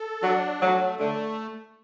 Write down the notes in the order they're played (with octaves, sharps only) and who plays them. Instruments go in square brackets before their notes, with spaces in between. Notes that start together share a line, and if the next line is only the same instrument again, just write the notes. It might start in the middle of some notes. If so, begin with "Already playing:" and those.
Already playing: [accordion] A4
[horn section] F#3 [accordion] D4
[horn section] F#3 [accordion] A3
[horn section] D3 [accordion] A3